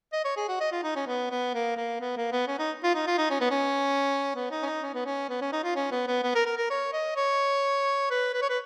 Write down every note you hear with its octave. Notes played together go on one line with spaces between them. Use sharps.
D#5
C#5
G#4
F#4
D#5
F4
D#4
C#4
B3
B3
A#3
A#3
B3
A#3
B3
C#4
D#4
F4
D#4
F4
D#4
C#4
B3
C#4
B3
D#4
C#4
D#4
C#4
B3
C#4
B3
C#4
D#4
F4
C#4
B3
B3
B3
A#4
A#4
A#4
C#5
D#5
C#5
B4
B4
C#5
B4